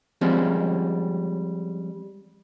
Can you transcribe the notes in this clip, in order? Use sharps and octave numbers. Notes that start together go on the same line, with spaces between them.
F3 G3 G#3 C4 C#4